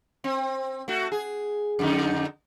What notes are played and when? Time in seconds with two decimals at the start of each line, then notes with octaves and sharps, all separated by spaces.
0.24 C4
0.88 A3 F#4
1.12 G#4
1.79 F2 D3 D#4